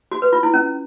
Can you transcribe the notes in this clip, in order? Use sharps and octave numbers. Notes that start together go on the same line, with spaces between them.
F#4
B4
F4
E4
C#4